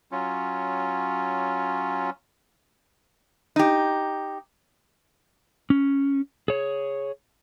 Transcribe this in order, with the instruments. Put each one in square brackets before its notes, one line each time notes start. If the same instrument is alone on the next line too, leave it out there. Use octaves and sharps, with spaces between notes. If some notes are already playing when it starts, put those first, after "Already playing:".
[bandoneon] F#3 C#4 F4
[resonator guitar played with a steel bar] D#4 G4
[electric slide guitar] C#4
G#4 C#5